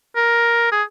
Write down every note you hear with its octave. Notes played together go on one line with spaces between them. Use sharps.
A#4
G#4